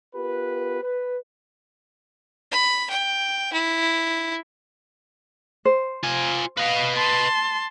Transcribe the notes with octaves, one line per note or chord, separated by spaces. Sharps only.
B3 F4 G4 A#4 B4
B4
B5
G5
E4
C5
F4 G#5
B4 D#5 F5
A5 C6